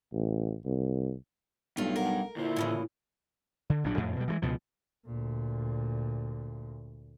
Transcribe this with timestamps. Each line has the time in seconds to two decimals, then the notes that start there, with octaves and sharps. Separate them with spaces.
0.13 A1
0.65 C2
1.77 B1 G3 A3 D4 F4
1.96 A#4 F#5
2.36 D2 A#2 E4 C5
2.56 A2 C#3 E3
3.70 D3
3.84 A#1 A2 F#3 D4
3.97 F2 A2
4.16 B2 G3
4.28 E3 F3 G#3
4.42 C#2 B2 F3
5.06 D2 A#2